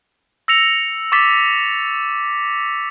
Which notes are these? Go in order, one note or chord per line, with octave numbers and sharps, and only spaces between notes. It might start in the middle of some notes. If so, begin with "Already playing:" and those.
E6 A#6 C#7 F7
C#6 D6 A6 B6